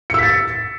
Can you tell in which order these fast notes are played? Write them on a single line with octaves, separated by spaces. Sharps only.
C#7 E6 B6 A6